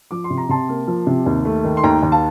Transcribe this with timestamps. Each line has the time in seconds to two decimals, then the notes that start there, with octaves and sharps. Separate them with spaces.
0.11 F3 D6
0.24 C6
0.30 C3
0.38 A#5
0.49 C3 A5 C6
0.69 A#3
0.87 F3
1.07 C3
1.26 D#2
1.45 A3
1.64 D#3
1.77 C6
1.83 D#2 G5 A#5
2.02 D#2
2.12 F5 A5